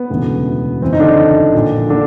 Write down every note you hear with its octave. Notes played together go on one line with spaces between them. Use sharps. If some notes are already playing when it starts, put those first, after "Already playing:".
Already playing: B3
E1 D2 C#3 E3
F#1 F2 C#3 E3 C4
D#4
D3 D4
A#1 A#2 F3
D3 D4